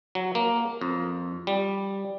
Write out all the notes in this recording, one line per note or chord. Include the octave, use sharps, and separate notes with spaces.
F#3
A#3
F2
G3